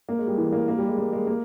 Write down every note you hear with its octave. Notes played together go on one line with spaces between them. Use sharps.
A#3
G#3
G3
E3
A#3
A#3
G3
G#3
A#3
G#3
A#3